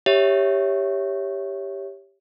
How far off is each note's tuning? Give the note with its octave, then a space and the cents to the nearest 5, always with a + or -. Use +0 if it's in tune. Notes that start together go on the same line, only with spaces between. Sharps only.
G4 +5 C#5 +0 E5 +0